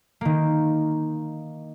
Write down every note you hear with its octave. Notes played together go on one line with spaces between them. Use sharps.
D#3 A#3